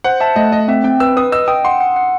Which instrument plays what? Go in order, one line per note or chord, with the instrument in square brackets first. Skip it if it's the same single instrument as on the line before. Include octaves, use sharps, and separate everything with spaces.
[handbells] C5 [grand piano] F#5
[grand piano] E5 [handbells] A5
[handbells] A3 [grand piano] D#5
[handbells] A3 [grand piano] D#5
[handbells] C4 [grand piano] E5
[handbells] C4 [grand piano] G5
[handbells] B4 [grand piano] E6
[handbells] B4 [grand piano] D#6
[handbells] D#5 [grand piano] E6
[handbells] G5 [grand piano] D#6
[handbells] F#5 [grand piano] C6
[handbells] F#5
F#5